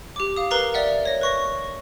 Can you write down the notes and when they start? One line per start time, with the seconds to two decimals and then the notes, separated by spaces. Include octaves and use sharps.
0.16 G4 D6
0.36 F5 D#6
0.51 A#4 B4 A#5 C7
0.74 D5 E5 F#5
1.05 C#5 A#6
1.21 B4 C#6 A#6